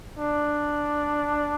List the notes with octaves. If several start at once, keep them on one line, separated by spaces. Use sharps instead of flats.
D4